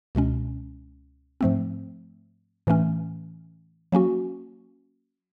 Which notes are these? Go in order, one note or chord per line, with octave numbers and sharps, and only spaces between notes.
C#2 B2 G#3 C#4
G#2 F3 A3 C4
A2 E3 A3 C#4
F#3 A#3 C#4 F#4